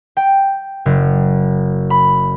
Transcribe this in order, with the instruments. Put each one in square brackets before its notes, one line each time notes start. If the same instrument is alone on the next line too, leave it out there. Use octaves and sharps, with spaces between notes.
[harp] G5
F#1
B5